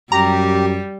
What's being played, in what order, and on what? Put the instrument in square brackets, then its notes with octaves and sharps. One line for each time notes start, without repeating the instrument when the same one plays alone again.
[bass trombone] F#2 [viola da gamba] G3 [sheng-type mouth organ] G4 [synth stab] A#5